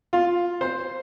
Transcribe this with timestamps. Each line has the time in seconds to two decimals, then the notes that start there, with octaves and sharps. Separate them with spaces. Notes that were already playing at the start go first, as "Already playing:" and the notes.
0.13 F4
0.61 C5